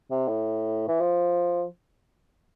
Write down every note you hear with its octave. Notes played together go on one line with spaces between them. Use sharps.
C3
A2
E3
F3